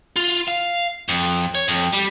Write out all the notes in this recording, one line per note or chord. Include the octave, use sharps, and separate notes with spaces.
F4
F5
F2
C#5
F2
G3